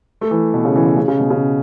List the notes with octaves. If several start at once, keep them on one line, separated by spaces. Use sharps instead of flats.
A3
E3
B2
C#3
E3
C#3
C#3
C#3
B2
C#3